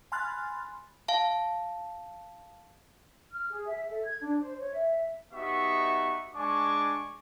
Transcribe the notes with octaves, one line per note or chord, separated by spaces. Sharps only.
G#5 B5 C6 F6 F#6 A6
F5 A5
F6
G#4
E5
A4
G#6
D4
C5
C#5
E5
B3 D#4 F#4 G4 E5 C#6
G#3 D4 G#5 C#6 D6